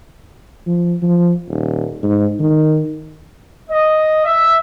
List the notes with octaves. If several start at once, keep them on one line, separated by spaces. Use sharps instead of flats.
F3
F3
D#1
G#2
D#3
D#5
E5